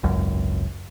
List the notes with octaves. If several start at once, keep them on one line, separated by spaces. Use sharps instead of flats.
G#1 C#2 F#2